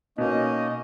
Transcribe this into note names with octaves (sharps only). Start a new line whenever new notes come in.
B2 A#3 C#4 D#4 D#5